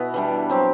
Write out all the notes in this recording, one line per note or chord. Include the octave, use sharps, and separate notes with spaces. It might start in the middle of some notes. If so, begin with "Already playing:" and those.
Already playing: B2 B3 E4
E3 G3 D4
F#3 C4 G4